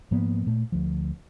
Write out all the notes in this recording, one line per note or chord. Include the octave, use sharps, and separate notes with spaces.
G#2 F3 A#3 B3
A#2 A3
D2 F3